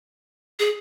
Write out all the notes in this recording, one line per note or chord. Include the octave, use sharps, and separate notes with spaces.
G#4